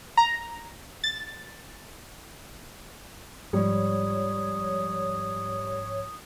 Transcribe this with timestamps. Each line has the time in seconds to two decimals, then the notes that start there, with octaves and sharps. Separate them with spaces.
0.17 A#5
1.04 A6
3.53 G#2 F3 G3 C#5 D#6